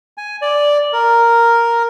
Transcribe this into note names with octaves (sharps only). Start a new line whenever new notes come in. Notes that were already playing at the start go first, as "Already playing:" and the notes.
G#5
D5
A#4